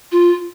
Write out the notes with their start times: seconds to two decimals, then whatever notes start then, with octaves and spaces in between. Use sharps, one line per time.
0.12 F4